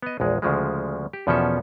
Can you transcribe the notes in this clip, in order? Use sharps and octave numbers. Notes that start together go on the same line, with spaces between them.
B3 D#5
A#1 E2 G#3
D2 C#3 F3 G#3
G4
E2 B2 F3 C#4 A4 E5